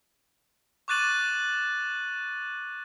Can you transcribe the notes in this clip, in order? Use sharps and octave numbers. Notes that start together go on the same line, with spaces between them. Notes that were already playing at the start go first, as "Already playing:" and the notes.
C#6 D6 F#6 A6 D#7 F#7